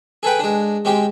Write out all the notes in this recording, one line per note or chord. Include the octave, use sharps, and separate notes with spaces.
G#4 A4 B4 G5
G#3 D4
G#3 C4 G4